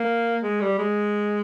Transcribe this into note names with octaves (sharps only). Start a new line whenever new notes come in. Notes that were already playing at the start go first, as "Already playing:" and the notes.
Already playing: A#3
G#3
G3
G#3